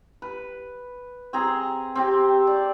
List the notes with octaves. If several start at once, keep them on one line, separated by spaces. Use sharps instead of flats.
B4
C4 G#4 A#5
C4 G4
D5